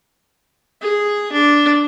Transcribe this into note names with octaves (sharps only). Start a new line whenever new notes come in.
G#4
D4